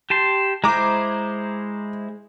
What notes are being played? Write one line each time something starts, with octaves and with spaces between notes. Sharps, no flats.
G4 A5 C6
G#3 E4 C5 A#5 D6